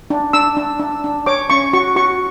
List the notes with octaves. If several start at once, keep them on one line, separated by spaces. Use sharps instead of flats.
D4
D4 E6
D4
D4
D4
C#5 D6
C#4 C#6
F#4 C#6
F#4 C#6